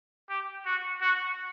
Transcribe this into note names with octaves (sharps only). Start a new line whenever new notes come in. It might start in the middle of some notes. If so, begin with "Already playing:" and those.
G4
F#4
F#4